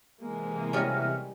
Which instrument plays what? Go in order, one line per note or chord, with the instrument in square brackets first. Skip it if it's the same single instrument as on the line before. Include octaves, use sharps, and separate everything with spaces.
[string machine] C3 E3 [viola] G#3 A#3
[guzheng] G3 C#4 D#5 [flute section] F#4 E5 F6